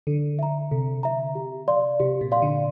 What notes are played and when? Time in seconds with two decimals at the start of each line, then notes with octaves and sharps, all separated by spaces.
0.07 D3 A4
0.39 E5 A#5
0.71 C3 A4
1.03 E5 A#5
1.35 G4
1.68 D5 F5 C6
2.00 C3 G4
2.21 A#2
2.32 D5 F5 C6
2.42 D3